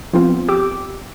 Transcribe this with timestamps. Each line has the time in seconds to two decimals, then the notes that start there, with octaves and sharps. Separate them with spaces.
0.13 F3 B3 C4 F4
0.49 G4 D6 E6